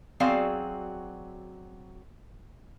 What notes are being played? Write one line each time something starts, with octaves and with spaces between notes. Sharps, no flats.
F#3 C4 F#4 G#4 D5 F5